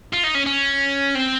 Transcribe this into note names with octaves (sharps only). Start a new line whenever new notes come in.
F4
D#4
C#4
C#4
C4